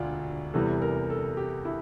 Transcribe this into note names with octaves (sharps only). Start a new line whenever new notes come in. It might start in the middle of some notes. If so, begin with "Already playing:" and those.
Already playing: E1 D2 D4 F4
E2 C3 E3 G3 A4
A#4
A4
G4
E4